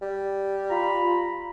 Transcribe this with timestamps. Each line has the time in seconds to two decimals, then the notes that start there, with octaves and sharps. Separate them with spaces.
0.02 G3
0.70 F4 A#5 B5